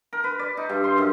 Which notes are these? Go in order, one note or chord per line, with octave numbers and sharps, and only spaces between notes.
A#4
B4
D5
D#4
G2
C6
F#2